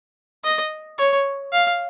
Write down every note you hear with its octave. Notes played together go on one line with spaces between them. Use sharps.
D#5
C#5
F5